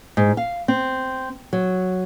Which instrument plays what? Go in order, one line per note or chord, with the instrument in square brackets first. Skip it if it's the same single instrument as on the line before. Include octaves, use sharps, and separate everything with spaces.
[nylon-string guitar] G#2
F5
C4
F#3